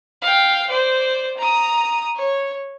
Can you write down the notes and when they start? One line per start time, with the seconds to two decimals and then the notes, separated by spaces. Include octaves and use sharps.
0.22 F5 G5
0.69 C5 D5
1.37 A#5 D#6
2.16 C#5